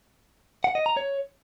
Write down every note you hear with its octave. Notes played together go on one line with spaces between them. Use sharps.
F#5
D#5
A#5
C#5